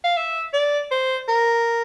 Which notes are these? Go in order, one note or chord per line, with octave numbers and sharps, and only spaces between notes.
F5
E5
D5
C5
A#4